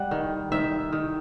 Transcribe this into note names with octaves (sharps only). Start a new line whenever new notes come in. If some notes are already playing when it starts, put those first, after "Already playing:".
Already playing: G3 F#5
D#3
D#3 E5
D#3